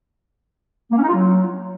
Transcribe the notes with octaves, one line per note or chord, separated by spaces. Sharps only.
A#3
C#4
D#4
F4
F#3